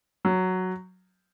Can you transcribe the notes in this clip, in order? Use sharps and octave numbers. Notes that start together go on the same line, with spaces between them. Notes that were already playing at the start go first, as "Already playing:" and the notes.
F#3